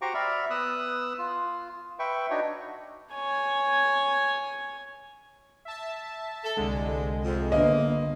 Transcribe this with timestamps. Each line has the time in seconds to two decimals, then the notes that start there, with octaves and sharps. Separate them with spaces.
0.02 F#4 G4 C5 A#5 C#6 D6
0.14 D5 E5 B5 F6
0.50 B3 D#6 E6 F#6
1.18 F4
1.99 B4 E5 G5 C#6
2.30 D4 D#4 F#4 C#5
3.13 C#5 G#5
5.65 E5 A5
6.44 A4
6.57 C2 D3 G#3
7.24 F2
7.52 G1 A#3 B3 D#5